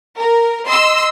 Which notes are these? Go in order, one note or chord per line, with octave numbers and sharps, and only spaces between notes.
A#4
D#5 C6 E6